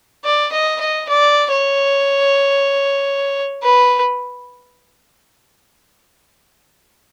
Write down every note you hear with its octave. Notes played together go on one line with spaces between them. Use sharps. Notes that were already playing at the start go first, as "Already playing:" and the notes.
D5
D#5
D#5
D5
C#5
B4